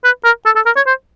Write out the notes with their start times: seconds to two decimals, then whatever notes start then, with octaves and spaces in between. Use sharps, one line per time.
0.04 B4
0.25 A#4
0.46 A4
0.56 A4
0.66 A#4
0.76 C#5
0.87 C5